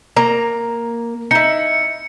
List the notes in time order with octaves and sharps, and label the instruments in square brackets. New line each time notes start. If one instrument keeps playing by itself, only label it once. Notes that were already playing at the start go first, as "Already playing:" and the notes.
[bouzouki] A#3 A#5
[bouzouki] D#4 E4 [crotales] C#7